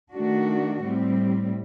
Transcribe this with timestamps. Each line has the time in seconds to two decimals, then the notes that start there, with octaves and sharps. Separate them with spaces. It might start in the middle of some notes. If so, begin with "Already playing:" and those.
0.13 D#3 A3 D4 F#4
0.82 A2 G3 C4